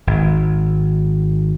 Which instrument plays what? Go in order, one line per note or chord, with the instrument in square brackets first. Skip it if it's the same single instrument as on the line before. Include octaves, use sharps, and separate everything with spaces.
[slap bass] G#1